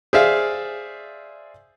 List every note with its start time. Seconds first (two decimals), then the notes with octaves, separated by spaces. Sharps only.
0.13 G#4 C5 D5 E5 F5